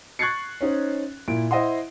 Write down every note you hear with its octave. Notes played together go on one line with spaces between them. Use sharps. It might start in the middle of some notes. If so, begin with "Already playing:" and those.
C#6 F#6 G#6 A6 C7 C#7
C#4 D#4 C5
A#2 E4 D7
E4 C5 D#5 E5 F#5 C6